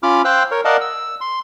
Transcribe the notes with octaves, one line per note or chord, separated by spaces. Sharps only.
C#4 F4 B5 D6 F6
C5 F5 G5 E6 F#6
A#4 C#5
A#4 D5 D#5 F5 F#5 A5
E6
C6